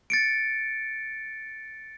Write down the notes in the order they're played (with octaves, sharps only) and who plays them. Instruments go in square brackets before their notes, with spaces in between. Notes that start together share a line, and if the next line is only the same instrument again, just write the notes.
[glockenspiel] A6 C#7 D7